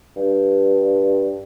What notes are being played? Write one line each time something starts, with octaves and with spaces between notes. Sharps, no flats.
G2